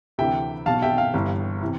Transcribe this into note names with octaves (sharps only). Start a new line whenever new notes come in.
D2 C3 E3 E5 G5
B1 B2 F5 A5
E5 G5
F5
G1 G2 E3
C3 E3